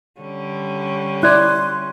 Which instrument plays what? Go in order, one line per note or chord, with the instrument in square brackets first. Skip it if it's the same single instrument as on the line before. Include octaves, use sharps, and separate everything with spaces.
[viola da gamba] D3 G3 C#4
[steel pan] E4 D5 [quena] C6 [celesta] F#6 G#6